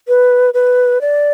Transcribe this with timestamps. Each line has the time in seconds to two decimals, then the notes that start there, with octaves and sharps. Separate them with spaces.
0.08 B4
0.54 B4
1.01 D5